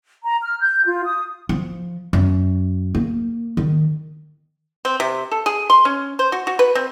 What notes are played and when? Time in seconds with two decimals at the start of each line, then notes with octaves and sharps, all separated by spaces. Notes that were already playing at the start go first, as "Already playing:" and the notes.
0.24 A#5
0.43 F6
0.60 G6
0.85 F4
1.05 D#6
1.49 F3
2.13 F#2
2.95 A#3
3.57 D#3
4.85 C4
5.00 C3
5.31 A4
5.46 G#4
5.70 C6
5.85 C#4
6.19 C5
6.32 F#4
6.47 F#4
6.59 B4
6.75 C4